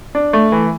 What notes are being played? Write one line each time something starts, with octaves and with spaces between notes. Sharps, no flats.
D4
A3
E3